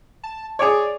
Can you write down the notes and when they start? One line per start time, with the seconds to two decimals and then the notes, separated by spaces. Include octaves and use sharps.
0.23 A5
0.59 G#4 C#5 D5 C#6 D6 F7